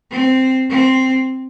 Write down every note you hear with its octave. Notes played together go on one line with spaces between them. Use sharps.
C4
C4